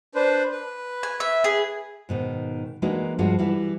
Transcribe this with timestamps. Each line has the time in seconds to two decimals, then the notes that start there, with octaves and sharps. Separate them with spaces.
0.15 D4 B4 C5
0.52 B4
1.03 G#5
1.20 E5
1.44 G#4
2.09 G#2 B2 D#3
2.82 E3 G#3 A#3 D4 D#4 F#4
3.18 G2 F3 G#3 F#4
3.39 E3 G3 E4 F#4